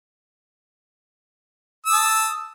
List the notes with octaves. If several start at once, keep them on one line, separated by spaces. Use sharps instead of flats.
A5 D#6 E6